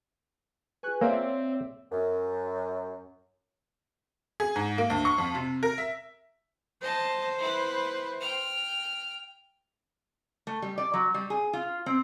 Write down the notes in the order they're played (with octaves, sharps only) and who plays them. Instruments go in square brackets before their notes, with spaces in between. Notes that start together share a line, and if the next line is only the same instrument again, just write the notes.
[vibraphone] F4 G#4 B4 [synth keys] G#5 C#6 F#6
[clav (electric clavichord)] A#3 [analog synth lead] C4 [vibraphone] C#5 [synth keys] D5 E5 E6
[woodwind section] F#2
[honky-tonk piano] G#4
G#2
A#3
D2
C#6
F2
C3
A#4
E5
[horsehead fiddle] C5 [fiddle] D#5 A5
[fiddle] E4 B4
G5 F6
[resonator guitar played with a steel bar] A3
G3
D5
F#3
G3
G#4
F4
C4